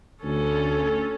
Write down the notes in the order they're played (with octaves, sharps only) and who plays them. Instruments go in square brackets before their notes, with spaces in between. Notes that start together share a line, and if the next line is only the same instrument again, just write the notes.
[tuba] D2 [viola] C#4 A4